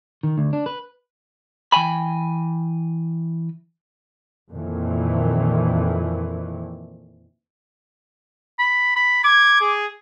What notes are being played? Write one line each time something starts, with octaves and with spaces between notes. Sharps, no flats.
D#3
D2
D4
B4
E3 G5 G#5 B5
F2 A#2 D#3 E3
B5
B5
D6 G#6
G#4